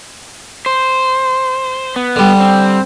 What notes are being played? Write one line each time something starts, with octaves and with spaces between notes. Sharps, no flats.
C5
B3
D3 G3
C4